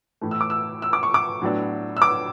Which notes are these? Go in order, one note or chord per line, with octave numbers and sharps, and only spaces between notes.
A2 E3 A3
E6
D6
E6
E6
D6
C#6
D6
A2 F#3 B3 D4
E6
D6